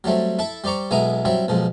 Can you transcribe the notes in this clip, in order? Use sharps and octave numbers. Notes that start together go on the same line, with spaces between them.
F#3 G3 A3 C4
E4 A4 E5 A5
G3 C5 D5 A#5 C#6
B1 G#3 B3 E4 G#5 A#5
F#3 G3 C4 E4
B1 F3 G#3